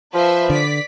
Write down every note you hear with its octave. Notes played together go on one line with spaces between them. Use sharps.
F3 B4 C5 E5
D3 D5 B6